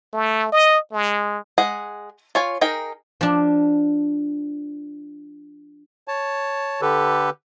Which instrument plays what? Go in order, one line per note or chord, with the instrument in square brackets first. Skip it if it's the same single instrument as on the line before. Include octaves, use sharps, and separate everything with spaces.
[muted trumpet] A3
D#5
G#3
[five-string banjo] G#3 G#4 F#5
F4 C#5 G#5
D#4 G#4 A#4 G5
[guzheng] F3 D4
[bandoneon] C#5 A5
D3 G4 A4 B4